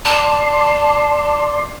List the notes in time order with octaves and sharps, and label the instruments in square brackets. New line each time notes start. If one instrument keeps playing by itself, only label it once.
[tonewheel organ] D5 C6 [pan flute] A5